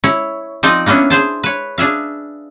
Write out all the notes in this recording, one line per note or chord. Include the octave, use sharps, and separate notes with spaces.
E4 C#5
F3 C4 D#4 D5 D#5
A#3 B3 C#4 D4 E4
G#4 C5 A5
B4 C#5
D4 G#4 E5 F5